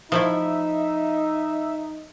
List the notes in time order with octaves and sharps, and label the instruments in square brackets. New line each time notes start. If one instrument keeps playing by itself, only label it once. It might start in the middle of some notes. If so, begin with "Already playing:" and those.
[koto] F3 A3 E4 [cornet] D#4 [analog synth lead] E5